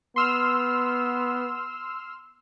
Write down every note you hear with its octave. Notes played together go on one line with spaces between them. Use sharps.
B3 C6 E6 F6